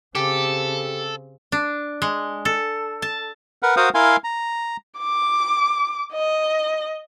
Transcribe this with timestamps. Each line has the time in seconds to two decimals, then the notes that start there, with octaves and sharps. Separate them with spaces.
0.15 C#3 C4 G4 A4
1.52 D4
2.02 G#3
2.45 A4
3.02 A5
3.63 A#4 B4 F#5
3.77 F#4 A#4 C5 F5 F#5 D#6
3.94 E4 A#4 F5 G#5 C6
4.24 A#5
4.99 D6
6.13 D#5